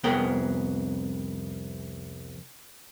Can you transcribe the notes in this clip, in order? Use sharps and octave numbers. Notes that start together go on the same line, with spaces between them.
C2 F2 B3 G#4 A#4 G5